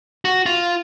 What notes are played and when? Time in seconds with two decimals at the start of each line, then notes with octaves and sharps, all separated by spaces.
0.25 F#4
0.46 F4